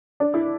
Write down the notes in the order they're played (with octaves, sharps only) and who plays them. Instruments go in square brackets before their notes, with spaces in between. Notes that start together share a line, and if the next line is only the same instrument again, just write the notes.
[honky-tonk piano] D4
E4